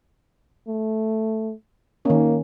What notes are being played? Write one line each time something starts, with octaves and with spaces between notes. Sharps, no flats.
A3
D#3 A#3 C#4